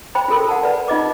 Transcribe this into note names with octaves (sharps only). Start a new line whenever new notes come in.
C5 G5 B5
F4 F#4 A4 A#4
F#5 A5
B4 D5
D#4 F4 D#5 D6